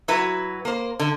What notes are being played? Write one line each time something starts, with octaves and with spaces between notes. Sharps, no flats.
F#3 E4 F#4 B4
A#3 C5
D3